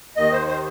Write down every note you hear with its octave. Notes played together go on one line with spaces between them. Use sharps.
D#2 D#3 D#5
C5
C5